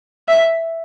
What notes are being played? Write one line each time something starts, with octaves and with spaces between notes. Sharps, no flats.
E5